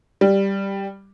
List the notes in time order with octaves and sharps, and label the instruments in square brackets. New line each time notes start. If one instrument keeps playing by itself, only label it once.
[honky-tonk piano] G3